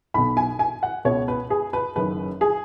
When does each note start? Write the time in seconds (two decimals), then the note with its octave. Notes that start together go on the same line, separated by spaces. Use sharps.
0.14 B1 B2 B5
0.37 G#5
0.59 G#5
0.83 F#5
1.05 C#2 B2 C#5
1.28 B4
1.50 G#4
1.73 B4
1.96 F#1 F#2 D#3 B4
2.41 G#4